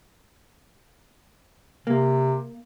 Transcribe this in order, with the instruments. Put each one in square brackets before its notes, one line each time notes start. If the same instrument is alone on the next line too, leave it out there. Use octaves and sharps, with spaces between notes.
[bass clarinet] C3 [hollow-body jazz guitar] A#3